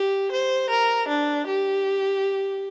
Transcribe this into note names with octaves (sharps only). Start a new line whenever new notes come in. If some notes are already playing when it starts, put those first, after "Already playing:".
Already playing: G4
C5
A#4
D4
G4